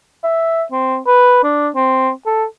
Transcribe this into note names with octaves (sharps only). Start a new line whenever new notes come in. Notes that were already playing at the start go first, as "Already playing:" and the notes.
E5
C4
B4
D4
C4
A4